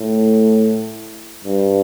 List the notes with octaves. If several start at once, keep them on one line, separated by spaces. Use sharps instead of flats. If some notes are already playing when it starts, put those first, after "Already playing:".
Already playing: A2
G2